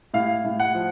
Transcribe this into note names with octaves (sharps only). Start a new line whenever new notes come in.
A2 F5
A2
F#5
F3